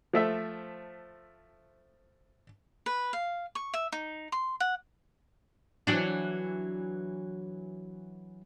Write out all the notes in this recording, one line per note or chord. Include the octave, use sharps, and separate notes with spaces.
F3 A3 E5
B4
F5
C#6
E5
D#4
C6
F#5
E3 F#3 D4